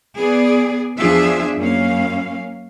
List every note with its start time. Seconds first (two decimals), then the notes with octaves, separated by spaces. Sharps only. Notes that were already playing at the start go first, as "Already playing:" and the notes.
0.18 B3 G#4 D5
0.97 E2 F3 D4 F4 G#4 E5
1.57 F#2 A#3 C#4 F5